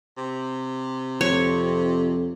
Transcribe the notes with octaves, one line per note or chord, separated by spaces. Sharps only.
C3
F2 C#5